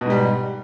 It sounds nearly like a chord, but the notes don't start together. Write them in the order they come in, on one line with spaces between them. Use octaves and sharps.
B2 G#2 G3